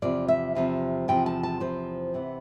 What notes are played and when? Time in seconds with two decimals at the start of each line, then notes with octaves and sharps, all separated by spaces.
0.02 E2 C3 F3 D5
0.28 E5
0.55 E2 C3 F3
1.08 E2 C3 F3 G5
1.26 A5
1.43 A5
1.60 E2 C3 F3 C5
2.14 C3 E3 B3